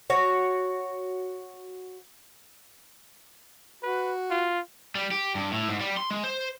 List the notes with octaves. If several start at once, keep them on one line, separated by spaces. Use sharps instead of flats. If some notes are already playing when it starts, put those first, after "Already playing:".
F#4 C#5
F#4 B4
F4
G3
G4
G2
A2
G#2
G3
C6
G#3
C5